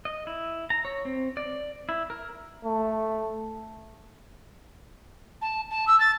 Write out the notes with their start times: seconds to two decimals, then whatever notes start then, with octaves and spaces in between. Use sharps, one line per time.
0.05 D#5
0.27 E4
0.70 A#5
0.85 C#5
1.05 C4
1.37 D5
1.89 E4
2.10 A#4
2.65 A3
5.42 A5
5.70 A5
5.87 E6
6.00 A6